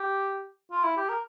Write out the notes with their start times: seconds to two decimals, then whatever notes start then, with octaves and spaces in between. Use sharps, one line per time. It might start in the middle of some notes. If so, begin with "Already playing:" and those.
Already playing: G4
0.71 F4
0.83 E4
0.97 G4
1.09 A#4